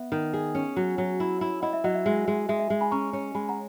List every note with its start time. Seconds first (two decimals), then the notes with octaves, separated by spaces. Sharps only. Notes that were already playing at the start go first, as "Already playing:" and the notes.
Already playing: B3 E5
0.12 D#3
0.33 G#4
0.55 C#4
0.77 F#3
0.98 F#3
1.20 E4
1.41 E4
1.62 E4 D#5 F#5
1.73 E5
1.84 F#3 D#5 F#5
1.95 E5
2.06 G#3 E5
2.28 G#3
2.49 G#3 E5
2.60 E5
2.70 G#3 E5
2.81 G#5 B5
2.91 C#4 A#5 C#6
3.13 C#4
3.35 G#3 G#5 B5
3.49 F#5 A#5